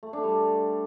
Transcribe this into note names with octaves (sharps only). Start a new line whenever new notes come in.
A3
D4
G3